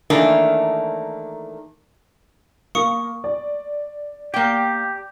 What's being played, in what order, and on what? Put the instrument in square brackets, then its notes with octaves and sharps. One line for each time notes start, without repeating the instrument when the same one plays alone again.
[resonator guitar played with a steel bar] D#3 E3 A3 A#3 D4
[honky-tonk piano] A#3 [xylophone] C#6 D#6 C#7
[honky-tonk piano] D5
[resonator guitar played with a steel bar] A#3 G5 [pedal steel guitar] G4